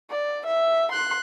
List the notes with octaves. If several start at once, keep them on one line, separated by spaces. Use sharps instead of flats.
D5
E5
C6 F#6